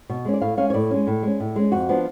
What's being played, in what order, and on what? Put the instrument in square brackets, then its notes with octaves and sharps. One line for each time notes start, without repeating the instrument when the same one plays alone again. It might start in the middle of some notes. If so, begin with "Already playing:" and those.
[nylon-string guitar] B2
G#3 C#4
D5
A2 F5
G#3 C#4 F5
C#5
A2 D5
G#3 C#4
A2
G#3 C#4
A2
G#3 C#4
F2 F#4
F3 B3 D4